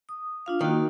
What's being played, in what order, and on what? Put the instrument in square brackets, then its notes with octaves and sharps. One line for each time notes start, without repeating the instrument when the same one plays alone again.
[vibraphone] D#6
D4 F4 F5
[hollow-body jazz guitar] D#3 [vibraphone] A#3 F#4